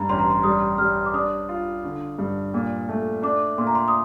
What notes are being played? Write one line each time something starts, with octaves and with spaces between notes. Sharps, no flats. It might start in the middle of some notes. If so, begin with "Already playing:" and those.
Already playing: G2 A#5
A1 C6
A#5
C6
G3 D#6
G3 F6
D6
D4 D#6
F4
D3
G2
A#2
A3
D4 D6
A#2 C6
A#5
C6
D#6